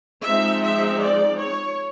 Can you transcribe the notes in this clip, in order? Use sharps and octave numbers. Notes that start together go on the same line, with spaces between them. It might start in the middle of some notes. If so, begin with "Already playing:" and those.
F3 G#3 C4 D#4 E5
E5
D5
C#5